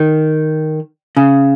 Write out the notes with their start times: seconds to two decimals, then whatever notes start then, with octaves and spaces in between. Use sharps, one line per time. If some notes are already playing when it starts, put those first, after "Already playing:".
Already playing: D#3
1.17 C#3